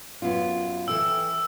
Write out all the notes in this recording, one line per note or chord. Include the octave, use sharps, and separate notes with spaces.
F#2 B3 F4
E3 A4 G5 E6